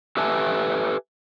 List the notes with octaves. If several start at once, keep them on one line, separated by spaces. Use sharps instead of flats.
G4 A4 B4 E5 G#5 A5